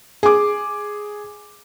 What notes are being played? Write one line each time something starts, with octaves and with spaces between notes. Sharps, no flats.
G#4 D6